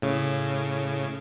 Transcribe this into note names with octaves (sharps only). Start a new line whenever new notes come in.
A2 C#3